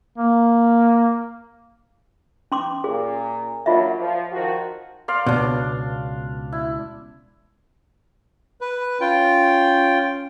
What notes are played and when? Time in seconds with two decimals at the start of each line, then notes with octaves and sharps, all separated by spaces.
0.18 A#3
2.52 C#4 C6 D6
2.84 A#2 G#4
3.66 F#3 A#3 D4 F4 D#5 E5
3.98 F3
4.32 D#3 F3 F#4
5.08 D5 F5 C6
5.26 C#2 B2 D4
6.52 E4
8.61 B4
9.01 C#4 F4 G5